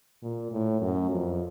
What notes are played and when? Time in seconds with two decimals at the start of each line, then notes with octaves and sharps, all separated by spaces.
0.23 A#2
0.52 A2
0.81 F#2
1.11 F2